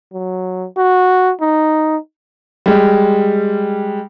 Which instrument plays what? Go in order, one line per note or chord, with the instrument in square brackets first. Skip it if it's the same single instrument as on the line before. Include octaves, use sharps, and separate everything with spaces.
[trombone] F#3
F#4
D#4
[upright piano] G3 G#3